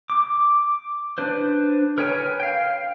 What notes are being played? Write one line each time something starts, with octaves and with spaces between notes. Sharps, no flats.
D6
D4 B4 C5
A#4 B4 C#5 G5 G#5
F5 G5